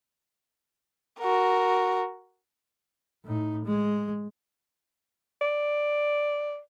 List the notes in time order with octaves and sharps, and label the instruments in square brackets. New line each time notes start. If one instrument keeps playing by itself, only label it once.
[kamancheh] F#4 A#4
[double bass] A2 D#4
G#3
[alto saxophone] D5